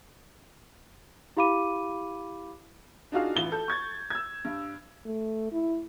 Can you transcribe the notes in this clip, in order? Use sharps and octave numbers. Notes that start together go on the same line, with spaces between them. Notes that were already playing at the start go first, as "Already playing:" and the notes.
E4 G4 F5 B5 D6 D#7
D4 D#4 F4 F#4 G#4 F5
A1 E3 F4 G7
A4 G6
C#6 G#6 A6
E6 G#6
G2
A3
E4